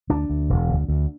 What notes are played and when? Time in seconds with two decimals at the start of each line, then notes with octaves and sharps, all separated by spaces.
0.10 D2 D4
0.30 D2
0.49 E1
0.69 D2
0.88 D2